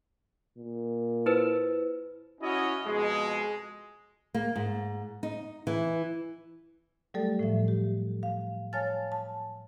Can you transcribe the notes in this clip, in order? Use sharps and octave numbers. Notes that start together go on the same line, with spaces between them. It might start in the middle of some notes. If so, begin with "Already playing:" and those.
A#2
E4 B4 C5
C#4 E4 F#4 C#5 D#5
F2 B2 G#3
A#3
G#2
D#4
E3
F#3 G3 A3 G4 A4 D5
A2 F3 E5
G4
F5
C#5 F5 G#5 A5 F6 A6
A5